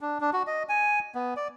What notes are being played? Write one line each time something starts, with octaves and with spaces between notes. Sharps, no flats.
D4
D4
F#4
D#5
G#5
B3
D5